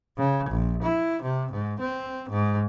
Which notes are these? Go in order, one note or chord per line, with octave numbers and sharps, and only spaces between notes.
C#3
A#1
E4
C3
G#2
C4
G#2